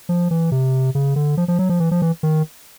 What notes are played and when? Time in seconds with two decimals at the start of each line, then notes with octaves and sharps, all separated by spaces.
0.09 F3
0.31 E3
0.52 C3
0.95 C#3
1.16 D3
1.37 F3
1.48 F3
1.59 F#3
1.69 F3
1.80 E3
1.91 F3
2.02 E3
2.23 D#3